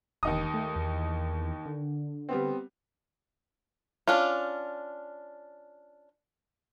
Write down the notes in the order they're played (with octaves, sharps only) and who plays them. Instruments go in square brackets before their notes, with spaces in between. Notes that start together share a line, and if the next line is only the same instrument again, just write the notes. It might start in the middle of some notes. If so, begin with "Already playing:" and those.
[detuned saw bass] E1 [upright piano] D#2 D#4 D#6
[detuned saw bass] A3
E2
D3
[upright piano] G3 B3 C4
[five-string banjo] C#4 D4 F4